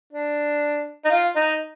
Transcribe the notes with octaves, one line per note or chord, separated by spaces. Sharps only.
D4
D#4
F4
D#4